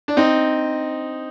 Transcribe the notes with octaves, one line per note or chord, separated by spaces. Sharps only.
D4
C4 D#4